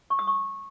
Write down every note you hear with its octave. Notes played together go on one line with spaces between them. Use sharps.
C#6
D#6
C#6